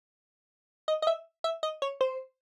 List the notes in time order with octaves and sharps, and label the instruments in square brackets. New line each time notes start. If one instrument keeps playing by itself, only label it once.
[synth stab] D#5
D#5
E5
E5
D#5
C#5
C5